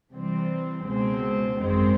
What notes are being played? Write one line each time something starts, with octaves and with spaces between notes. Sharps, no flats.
C3 E3 G3 C4
C#2 B2 G#3 C4
G#1 F#2 D#3 G#3 C4